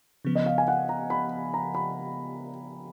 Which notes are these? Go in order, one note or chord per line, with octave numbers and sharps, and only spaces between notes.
C#3 F3 B3
D#5
F5
G#5
F#5
A#5
B5
A#5
B5